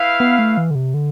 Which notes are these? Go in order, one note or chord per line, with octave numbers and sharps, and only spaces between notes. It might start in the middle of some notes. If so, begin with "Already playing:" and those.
Already playing: E4 B4 F5
B3
A3
E3
D3
C3
D3